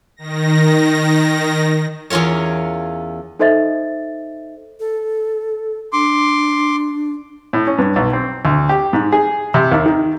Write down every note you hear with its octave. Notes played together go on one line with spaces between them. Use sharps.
D#3 A#6
E2 C#4 F4 A#4 C#5
D#4 A4 C5 D#5 E5 A6
A4
D4 C6 D6
A2
C#4
G2
B1
C4
D2
G4
G#2
G#4
C3
D#2
D#3